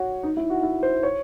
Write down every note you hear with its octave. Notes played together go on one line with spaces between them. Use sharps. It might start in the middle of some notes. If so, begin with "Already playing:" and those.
Already playing: F#4 C#5
D#4
E4
F#4
E4
C5
C#5